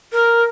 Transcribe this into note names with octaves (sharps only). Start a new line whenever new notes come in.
A#4